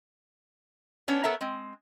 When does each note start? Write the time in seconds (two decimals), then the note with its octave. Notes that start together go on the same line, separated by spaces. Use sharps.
1.08 B3 C#4 D4 C#5
1.23 B3 A4 A#4 C#5 E5 A5
1.41 G#3 C4